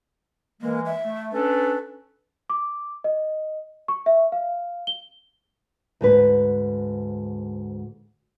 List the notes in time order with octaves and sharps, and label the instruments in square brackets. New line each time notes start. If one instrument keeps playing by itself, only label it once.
[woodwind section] E3 G#3 [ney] A#3
[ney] E5
[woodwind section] A3
[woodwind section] C#4 D4 A4 [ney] B4
[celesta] D6
D#5
C#6
E5
F5
G7
[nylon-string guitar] D2 G#2 B4